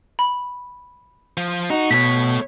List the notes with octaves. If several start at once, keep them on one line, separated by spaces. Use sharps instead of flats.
B5
F3
D#4 F#4
B2 A3 C#5 B6